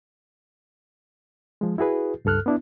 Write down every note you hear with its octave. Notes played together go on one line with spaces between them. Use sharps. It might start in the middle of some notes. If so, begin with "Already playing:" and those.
F3 G#3
E4 F#4 G#4 B4
C#2 G2 A4 F6 F#6
B3 D4 E4